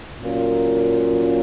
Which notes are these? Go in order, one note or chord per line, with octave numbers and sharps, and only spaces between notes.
A#2 F#3 C#4 F4 A#4